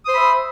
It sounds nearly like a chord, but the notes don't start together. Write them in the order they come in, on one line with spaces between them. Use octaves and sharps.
D#6 C5 B5 E5